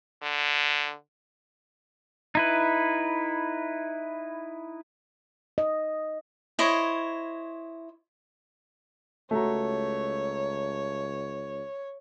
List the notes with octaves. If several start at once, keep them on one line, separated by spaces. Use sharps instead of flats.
D3
D#4 E4 B4
D#5
E4 C5 C#5 D#5
C#2 A3 F#4 C#5 A#5